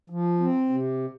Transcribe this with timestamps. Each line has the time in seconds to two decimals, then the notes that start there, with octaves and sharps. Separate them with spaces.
0.10 F3
0.40 C4
0.70 C3